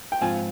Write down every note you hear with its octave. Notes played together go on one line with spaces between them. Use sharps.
G5
G#2 F3 C4 F4 G#5